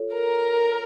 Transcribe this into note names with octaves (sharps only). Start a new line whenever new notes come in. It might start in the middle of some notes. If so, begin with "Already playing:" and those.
Already playing: F4 A4 C#5
A#4